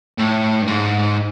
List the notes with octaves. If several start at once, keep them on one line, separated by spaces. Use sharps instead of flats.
A2
G2
G#2